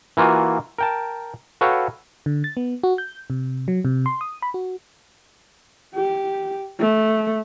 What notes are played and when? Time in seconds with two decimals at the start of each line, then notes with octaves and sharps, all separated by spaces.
0.17 E3 A#3 F4 F#4 G#5
0.78 A#4 G5 A5
1.61 F#4 A4 B4 C#5 F5 G5
2.26 D3
2.44 A6
2.57 B3
2.83 F#4
2.98 G6
3.30 C3
3.68 F#3
3.85 C3
4.06 C6
4.21 D#6
4.42 B5
4.54 F#4
5.95 G4
6.79 A3